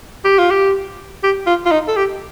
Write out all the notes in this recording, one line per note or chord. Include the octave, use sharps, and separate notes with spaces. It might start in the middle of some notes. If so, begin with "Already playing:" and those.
G4
F4
G4
G4
F4
F4
D#4
A4
G4